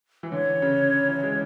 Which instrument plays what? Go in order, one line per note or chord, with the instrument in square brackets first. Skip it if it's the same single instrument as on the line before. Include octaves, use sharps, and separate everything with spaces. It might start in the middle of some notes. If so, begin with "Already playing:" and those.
[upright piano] E3
[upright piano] D3 [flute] C#5
[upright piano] C#3
E3
G#3